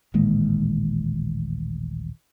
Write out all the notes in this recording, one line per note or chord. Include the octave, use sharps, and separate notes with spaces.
D#1 A1 D#2 G#3